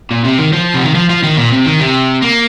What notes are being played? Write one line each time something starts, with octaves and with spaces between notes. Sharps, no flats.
A#2
C3
D#3
F3
C3
D#3
F3
F3
D#3
A#2
C3
D#3
C3
A#3